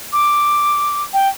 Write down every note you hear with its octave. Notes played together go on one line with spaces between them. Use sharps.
D6
G5